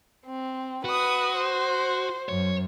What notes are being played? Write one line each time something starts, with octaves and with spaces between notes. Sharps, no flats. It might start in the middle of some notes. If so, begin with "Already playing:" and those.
C4
F#4 B4 D#6
C5
F#2 C#5